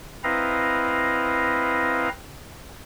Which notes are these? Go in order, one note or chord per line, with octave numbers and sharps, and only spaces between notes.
C4 E4 B4 D#5 F5 A#5